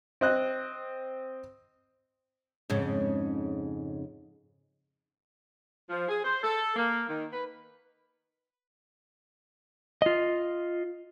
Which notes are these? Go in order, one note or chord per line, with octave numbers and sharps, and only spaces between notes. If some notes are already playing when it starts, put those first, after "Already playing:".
C4 D#5 F#6
F2 G#2 C#3
F3
G#4
C5
A4
A#3
D#3
B4
F4 D#5